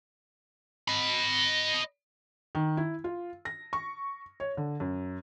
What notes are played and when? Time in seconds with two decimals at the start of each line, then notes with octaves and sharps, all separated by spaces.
0.88 D#5 B5
2.55 D#3
2.77 E4
3.04 F4
3.45 A#6
3.73 C#6
4.40 C#5
4.57 D3
4.80 F#2